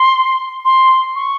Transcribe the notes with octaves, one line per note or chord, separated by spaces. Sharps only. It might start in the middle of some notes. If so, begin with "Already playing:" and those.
Already playing: C6
C6
C#6